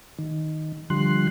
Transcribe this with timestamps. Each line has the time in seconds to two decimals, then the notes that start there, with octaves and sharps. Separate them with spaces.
0.19 D#3
0.90 D3 F3 G3 C6 F#6